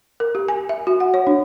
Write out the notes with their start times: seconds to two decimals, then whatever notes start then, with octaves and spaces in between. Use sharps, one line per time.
0.20 A#4
0.35 G4
0.48 G#5
0.69 E5
0.87 F#4
1.00 F#5
1.14 C#5
1.27 D4